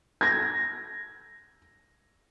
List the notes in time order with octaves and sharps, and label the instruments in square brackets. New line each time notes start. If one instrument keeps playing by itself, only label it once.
[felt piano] G#6 A#6